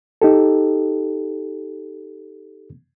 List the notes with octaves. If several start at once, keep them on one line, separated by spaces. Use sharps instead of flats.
D#4 G4 A4